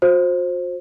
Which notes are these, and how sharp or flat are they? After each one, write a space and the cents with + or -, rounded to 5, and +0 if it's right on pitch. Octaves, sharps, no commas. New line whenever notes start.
F#4 -45 C5 +15